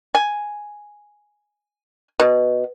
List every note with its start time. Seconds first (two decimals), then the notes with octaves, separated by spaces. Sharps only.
0.15 G#5
2.20 B2